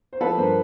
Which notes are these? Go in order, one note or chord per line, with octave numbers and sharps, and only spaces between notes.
C5
F3 A4 B4
G2 A#4 C5